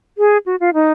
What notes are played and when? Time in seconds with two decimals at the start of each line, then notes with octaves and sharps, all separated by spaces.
0.18 G#4
0.46 F#4
0.60 F4
0.74 D#4